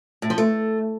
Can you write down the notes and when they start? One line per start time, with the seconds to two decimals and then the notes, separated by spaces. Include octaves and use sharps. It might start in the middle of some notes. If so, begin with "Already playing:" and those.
0.22 A2
0.30 F3
0.38 A3